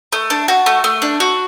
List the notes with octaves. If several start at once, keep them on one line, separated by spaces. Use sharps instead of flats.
A3
D4
F#4
A3
A3
D4
F#4